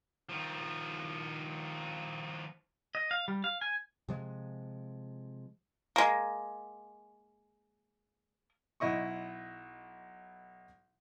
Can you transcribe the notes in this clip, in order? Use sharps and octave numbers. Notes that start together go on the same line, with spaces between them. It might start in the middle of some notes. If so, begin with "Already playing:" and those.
D#3 F3
D#5
F5
G3
F5
G#5
C3 F3 G#3
G#3 A#3
B1 E4 D#5 C#6